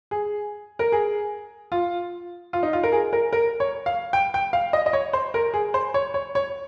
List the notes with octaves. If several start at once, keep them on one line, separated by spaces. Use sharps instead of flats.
G#4
A#4
G#4
F4
F4
D#4
F4
A#4
G#4
A#4
A#4
C#5
F5
G5
G5
F5
D#5
D#5
C#5
C5
A#4
G#4
C5
C#5
C#5
C#5